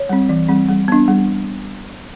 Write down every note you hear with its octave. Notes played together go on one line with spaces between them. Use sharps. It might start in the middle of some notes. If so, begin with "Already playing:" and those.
Already playing: C#5
G3 C4
E3
G3 C4
G3
B3 D4
G3